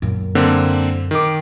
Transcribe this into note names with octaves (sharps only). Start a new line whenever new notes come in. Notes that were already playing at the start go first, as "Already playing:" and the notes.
F#2 A#2
D3 A#3 C4
D#3 D6